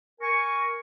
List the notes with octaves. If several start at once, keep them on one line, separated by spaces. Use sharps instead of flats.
A#4 G#5 C#6